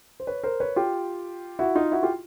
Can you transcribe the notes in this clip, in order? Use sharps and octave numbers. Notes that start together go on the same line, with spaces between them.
C5
B4 C#5
A#4 C5
B4 C#5
F4 G4
E4 F#4
D#4 F4
E4 F#4
F4 G4